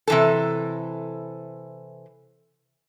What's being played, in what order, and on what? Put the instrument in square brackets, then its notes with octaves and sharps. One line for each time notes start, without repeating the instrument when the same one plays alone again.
[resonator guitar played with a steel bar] C3 E3 A4